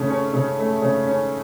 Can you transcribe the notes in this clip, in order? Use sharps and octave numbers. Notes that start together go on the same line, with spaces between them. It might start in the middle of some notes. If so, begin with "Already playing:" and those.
Already playing: C#3 A3
C#4
C#3
A3
C#3
C#4